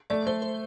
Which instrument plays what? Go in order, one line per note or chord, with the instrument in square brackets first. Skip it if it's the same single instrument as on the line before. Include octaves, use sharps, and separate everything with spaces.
[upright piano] A3 [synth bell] D5
[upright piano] A3 [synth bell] C5
[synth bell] C5